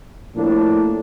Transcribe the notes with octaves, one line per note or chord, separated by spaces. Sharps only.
A2 F3 A#3 D4